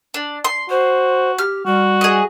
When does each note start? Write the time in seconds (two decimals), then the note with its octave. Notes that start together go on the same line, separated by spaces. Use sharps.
0.14 D4
0.44 C6
0.70 F#4 C5
1.38 G4 F6
1.66 G3 F#4
2.01 G#4 D#5